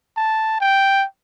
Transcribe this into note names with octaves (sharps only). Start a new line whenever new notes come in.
A5
G5